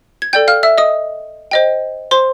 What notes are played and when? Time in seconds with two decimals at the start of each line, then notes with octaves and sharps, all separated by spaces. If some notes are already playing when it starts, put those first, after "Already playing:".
0.22 G#6
0.33 A4 D5 G5 G6
0.48 F5 F6
0.63 E5 E6
0.78 D#5 D#6
1.51 C5 D#5 G5
2.11 C5 C6